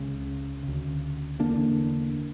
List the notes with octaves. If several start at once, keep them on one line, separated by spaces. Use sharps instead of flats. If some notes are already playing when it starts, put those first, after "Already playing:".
Already playing: C#2 C#3
C#3
D2
E2 D3 A#3 D4